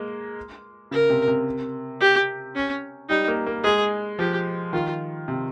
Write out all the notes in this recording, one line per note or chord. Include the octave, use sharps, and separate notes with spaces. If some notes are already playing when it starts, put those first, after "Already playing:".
Already playing: G#3 A#3
C#3 A#4
C3
C3
G4
C#4
G3 D#4
A#3
A#3
G#3 G#4
F3 G4
D#3 F4
C3